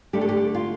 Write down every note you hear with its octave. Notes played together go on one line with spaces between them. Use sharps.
D3 A3 D4 G4
A4
G4
F4